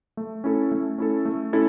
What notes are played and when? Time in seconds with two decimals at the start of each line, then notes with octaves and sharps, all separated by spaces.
0.17 A3
0.44 C#4 E4 A4
0.72 A3
0.98 C#4 E4 A4
1.25 A3
1.53 C#4 E4 A4